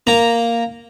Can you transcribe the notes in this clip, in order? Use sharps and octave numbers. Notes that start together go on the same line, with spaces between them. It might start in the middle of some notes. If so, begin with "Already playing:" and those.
A#3 A#5